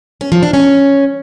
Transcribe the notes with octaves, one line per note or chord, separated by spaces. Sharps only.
C#4
F3
D4
C#4